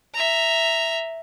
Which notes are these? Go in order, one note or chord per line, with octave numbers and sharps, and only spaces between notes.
E5 A#5